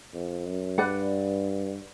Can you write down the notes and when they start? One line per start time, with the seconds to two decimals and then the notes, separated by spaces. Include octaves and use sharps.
0.14 F2
0.46 F#2
0.78 G2 B4 D5 F#5